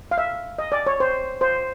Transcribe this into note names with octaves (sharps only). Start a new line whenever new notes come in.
F5
E5
D#5
D5
C#5
C5
C5